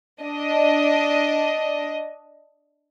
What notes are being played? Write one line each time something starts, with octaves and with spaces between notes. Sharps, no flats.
D4 D#5